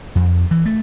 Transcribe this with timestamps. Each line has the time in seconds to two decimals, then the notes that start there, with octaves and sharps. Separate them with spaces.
0.15 F2
0.51 E3
0.66 A3